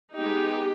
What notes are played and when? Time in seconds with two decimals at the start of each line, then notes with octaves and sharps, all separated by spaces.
0.16 G#3 B3 D#4 G4